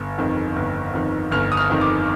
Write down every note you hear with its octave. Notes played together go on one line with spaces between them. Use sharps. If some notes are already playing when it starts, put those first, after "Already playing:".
Already playing: G1
F2 D#3
G1
F2 D#3
G1 F6
D#6
F6
F2 D#3
D6